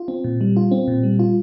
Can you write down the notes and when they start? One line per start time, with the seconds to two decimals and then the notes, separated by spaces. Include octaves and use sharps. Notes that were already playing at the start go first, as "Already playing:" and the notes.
Already playing: F4
0.08 C4
0.24 A#2
0.41 G3
0.56 F4
0.71 C4
0.88 A#2
1.03 G3
1.19 F4